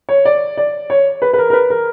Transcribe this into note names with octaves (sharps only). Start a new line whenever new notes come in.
C#5
D5
D5
C#5
B4
B4
A#4
A#4
B4
A#4